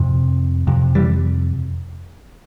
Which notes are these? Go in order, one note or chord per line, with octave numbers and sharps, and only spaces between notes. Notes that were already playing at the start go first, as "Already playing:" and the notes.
Already playing: F2 C3
F2 C3
E3 G3